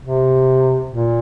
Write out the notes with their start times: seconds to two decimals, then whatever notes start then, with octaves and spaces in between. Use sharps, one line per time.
0.05 C3
0.91 A#2